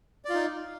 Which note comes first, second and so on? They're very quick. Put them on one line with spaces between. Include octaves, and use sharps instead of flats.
D5 F4 D#4